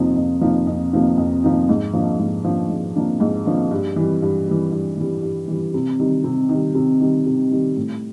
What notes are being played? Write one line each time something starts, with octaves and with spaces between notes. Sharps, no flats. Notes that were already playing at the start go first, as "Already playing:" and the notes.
Already playing: F2 C3 F3 A#3 D#4
F2
C3 F3 A#3 D#4
F2
C3 F3 A#3 D#4
F2
C3 F3 A#3 D#4
G#2
F3 A#3 D4
G#2
F3 A#3 D4
G#2
F3 A#3 D4
G#2
F3 A#3 D4
G2
E3 G3
G2
E3 G3
G2
E3 G3
G2
E3 G3
C3
D#3 G3
C3
D#3 G3
C3
D#3 G3
C3
D#3 G3
A2